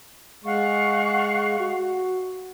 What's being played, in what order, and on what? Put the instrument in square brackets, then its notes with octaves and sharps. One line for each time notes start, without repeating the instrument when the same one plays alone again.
[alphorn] G#3 [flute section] F5 F#5 C#6
[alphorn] F#4